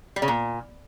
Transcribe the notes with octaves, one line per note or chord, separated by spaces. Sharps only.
G3
C#3
A#2